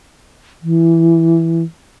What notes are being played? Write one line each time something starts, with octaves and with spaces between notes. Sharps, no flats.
E3